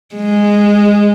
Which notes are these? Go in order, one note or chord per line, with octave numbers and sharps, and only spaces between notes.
G#3